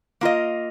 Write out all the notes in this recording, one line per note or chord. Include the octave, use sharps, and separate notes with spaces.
A#3 F4 D#5